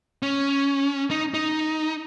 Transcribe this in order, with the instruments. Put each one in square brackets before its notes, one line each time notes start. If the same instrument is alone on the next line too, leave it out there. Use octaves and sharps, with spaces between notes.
[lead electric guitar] C#4
D#4
D#4